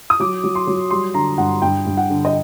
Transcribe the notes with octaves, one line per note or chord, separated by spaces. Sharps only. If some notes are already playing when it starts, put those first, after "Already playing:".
D#6
F#3 D6
F#3
C6
F#3
G3 C6
D3 A#5
G2 F#5
G2 G5
G2
F#5
D3
D#5